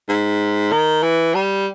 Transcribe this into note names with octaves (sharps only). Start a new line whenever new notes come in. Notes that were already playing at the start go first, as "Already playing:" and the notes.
G#2
D#3
E3
G3